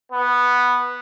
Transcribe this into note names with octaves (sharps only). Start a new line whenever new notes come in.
B3